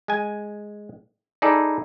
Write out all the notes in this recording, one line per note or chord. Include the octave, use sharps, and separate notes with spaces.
G#3 G#5
D#4 E4 G#4 A4 D5